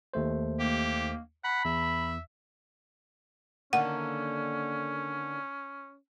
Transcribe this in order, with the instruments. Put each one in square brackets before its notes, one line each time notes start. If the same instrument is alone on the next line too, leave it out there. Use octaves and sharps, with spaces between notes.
[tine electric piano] D#2 A3 C5
[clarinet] A#3 [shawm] G4
[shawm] F#5 [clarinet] B5
[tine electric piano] E2 [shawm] E5
[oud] D3 D#3 A#3 [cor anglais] C#4 [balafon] F#5